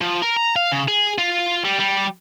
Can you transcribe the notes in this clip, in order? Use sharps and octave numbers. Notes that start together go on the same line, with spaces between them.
F3
A#4
A#5
F5
C#3
G#4
F4
G3
G3